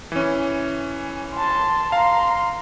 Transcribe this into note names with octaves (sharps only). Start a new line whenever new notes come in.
E3 C#4
A5 C6
F5 A#5 C6